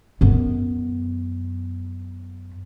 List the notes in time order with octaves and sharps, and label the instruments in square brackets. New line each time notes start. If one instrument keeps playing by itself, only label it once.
[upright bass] F#2 B3